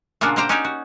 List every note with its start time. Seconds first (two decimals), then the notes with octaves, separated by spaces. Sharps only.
0.21 A#2 C#3 A#3 D4 F4 F#4
0.36 A#3 C4 G4 C5 G5 A#5
0.49 C#4 D#4 F#4 G4 C#5 D5
0.64 F#4